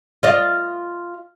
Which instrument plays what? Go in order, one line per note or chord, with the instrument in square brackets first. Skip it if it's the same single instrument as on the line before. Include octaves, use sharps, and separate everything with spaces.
[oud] F4 D5 D#5